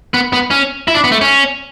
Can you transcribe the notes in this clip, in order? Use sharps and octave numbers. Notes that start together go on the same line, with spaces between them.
B3
B3
C#4
E4
D4
B3
A3
C#4